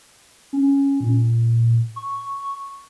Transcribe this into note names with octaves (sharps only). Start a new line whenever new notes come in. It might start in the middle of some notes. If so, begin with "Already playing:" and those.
C#4
A#2
C#6